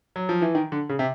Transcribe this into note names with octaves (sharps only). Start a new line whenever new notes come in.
F#3
F3
E3
D#3
D3
C#3
C3